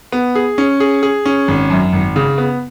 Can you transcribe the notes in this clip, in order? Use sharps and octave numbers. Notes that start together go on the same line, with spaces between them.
B3
G#4
C#4
G#4
G#4
C#4
G#1
F#2
G#1
C#3
B3